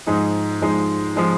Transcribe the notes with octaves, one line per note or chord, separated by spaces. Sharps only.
G#2 F3 G#3 D#4
G#2 F3 G#3 D#4
F3 G#3 D#4